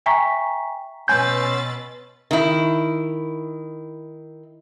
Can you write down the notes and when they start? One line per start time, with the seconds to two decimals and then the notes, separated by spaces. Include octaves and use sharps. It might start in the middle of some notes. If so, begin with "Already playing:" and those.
0.06 E5 G5 G#5 A#5 C#6 B6
1.08 B2 C#4 B4 G#5 C6 E6 G6 A6
2.31 D#3 E4